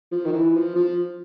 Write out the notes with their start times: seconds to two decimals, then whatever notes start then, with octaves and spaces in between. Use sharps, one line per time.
0.12 F3
0.25 D#3
0.33 E3
0.55 F3
0.76 F3